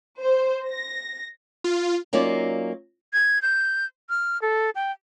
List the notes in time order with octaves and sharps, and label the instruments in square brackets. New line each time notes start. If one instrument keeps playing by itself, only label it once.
[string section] C5
A#6
[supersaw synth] F4
[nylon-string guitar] F#3 A#3 C#4 D#4 F4 D5
[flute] G#6
G6
F6
A4
G5